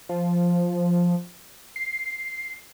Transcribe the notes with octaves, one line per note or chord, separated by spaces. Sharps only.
F3
C7